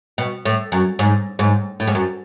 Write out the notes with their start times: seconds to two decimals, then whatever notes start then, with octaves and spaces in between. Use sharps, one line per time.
0.18 B2
0.45 A2
0.72 F#2
0.99 G#2
1.39 G#2
1.80 A2
1.87 G#2
1.95 F#2